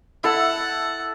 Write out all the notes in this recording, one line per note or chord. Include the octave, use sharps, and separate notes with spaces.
E4 A4 E5 F#5